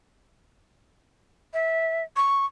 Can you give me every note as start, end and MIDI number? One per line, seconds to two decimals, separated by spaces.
1.54 2.03 76
2.16 2.46 85